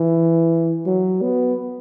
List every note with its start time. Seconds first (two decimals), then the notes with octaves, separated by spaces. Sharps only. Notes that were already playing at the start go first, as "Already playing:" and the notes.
Already playing: E3
0.86 F#3
1.22 B3